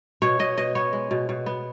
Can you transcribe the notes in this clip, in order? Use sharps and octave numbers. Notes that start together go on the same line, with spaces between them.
B2 C#5
B2 D#5
B2 D#5
B3 C#5
G#3
B2
B2
B3